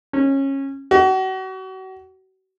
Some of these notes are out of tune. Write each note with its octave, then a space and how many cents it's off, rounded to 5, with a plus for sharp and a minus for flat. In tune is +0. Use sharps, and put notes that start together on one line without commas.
C#4 -20
F#4 +35